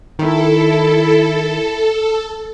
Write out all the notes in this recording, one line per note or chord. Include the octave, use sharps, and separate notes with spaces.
D#3 E4 A4